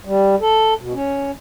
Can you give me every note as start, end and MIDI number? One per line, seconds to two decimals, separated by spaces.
0.05 0.35 55
0.41 0.74 69
0.80 0.93 47
0.94 1.31 61